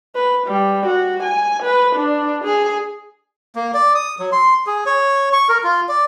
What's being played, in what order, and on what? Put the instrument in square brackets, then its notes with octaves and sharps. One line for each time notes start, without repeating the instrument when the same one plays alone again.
[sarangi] B4
G3
F#4
G#5
B4
D4
G#4
[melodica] A#3
D5
D#6
F#3
C6
G#4
C#5
C#6
A#4
F4
D5